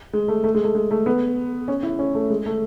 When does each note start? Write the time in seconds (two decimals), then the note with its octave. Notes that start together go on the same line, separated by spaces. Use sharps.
0.13 G#3
0.28 A3
0.44 A3
0.54 G#3
0.64 A3
0.75 G#3
0.91 A3
1.06 B3
1.68 C#4
1.83 E4
1.99 C#4
2.15 A3
2.30 G#3
2.46 A3